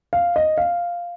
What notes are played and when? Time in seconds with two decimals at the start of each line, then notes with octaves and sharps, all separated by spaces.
0.13 F5
0.36 D#5
0.58 F5